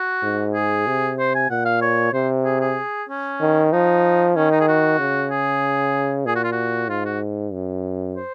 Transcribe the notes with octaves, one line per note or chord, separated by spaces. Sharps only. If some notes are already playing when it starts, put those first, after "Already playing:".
Already playing: F#4
G#2
G#4
C3
C5
G#5
A#2 F#5
F5
C#5
C3 C5
G#4
G#4
C#4
D#3
F3 D#4
D#3 C#4
D#4
G#4
F#4
C#3
G#4
A#2 G#4
F#4
F4
F#4
G#2 F4
F#4
F#2
C5